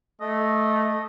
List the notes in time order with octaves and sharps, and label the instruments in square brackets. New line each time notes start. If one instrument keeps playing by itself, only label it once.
[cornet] A3 [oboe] D#5